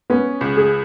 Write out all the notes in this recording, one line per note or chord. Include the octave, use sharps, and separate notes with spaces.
B3 C#4
C#2
G#4